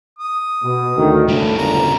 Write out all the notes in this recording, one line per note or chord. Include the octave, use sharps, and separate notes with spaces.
D#6
B2
D2 D#3
A2 C#3 G3
G1 F#2 A#5